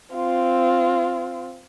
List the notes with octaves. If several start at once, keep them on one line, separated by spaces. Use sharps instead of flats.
C4 F4